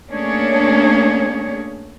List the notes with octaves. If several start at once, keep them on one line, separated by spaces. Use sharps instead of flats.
A3 A#3 C#4 D4 G#4 C#5